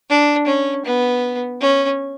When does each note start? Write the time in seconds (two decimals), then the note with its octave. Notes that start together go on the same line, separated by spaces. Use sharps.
0.09 D4
0.47 C#4
0.85 B3
1.61 C#4